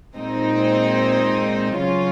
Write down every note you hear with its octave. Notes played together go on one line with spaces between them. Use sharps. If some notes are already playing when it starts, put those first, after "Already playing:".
A#2 G#3 C4 D#4
C#3 F#3 C#4 F4